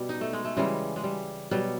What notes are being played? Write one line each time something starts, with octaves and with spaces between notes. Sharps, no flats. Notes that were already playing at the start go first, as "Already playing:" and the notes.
Already playing: B2 G3
D#4
A3
G#3
A3
C#3 E3 G3 G#3
G#3
G3
B2 F#3 G3